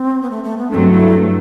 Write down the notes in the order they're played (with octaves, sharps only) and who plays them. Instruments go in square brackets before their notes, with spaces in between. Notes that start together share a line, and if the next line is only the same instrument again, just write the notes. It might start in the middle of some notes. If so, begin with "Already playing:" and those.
Already playing: [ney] C4
B3
A3
A3
B3
[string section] G2 F#3 A3 [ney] C4 D4
[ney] E4